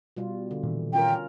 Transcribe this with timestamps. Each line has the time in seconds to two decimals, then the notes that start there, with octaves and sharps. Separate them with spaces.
0.17 B2 G3 F4
0.51 D3
0.63 A#2 D#3 E3
0.93 C#4 F4 A#4 G5